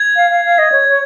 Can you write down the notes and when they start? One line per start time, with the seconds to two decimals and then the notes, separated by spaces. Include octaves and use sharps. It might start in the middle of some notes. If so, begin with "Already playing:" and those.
Already playing: G#6
0.16 F5
0.31 F5
0.45 F5
0.58 D#5
0.72 C#5
0.89 C#5